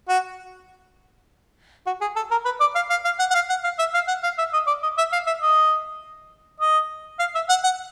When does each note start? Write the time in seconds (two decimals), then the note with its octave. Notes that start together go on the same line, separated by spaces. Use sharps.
0.09 F#4
1.86 F#4
2.01 G#4
2.16 A4
2.31 A#4
2.45 B4
2.60 D5
2.75 F5
2.90 F5
3.05 F5
3.19 F#5
3.31 F#5
3.34 F5
3.49 F#5
3.64 F5
3.79 E5
3.94 F5
4.08 F#5
4.24 F5
4.38 E5
4.53 D#5
4.67 D5
4.83 D#5
4.98 E5
5.13 F5
5.27 E5
5.42 D#5
6.60 D#5
7.19 F5
7.35 E5
7.49 F#5
7.64 F#5